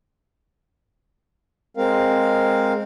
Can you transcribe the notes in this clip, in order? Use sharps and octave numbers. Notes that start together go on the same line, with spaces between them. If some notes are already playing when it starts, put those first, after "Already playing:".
G#3 C4 A#4 F5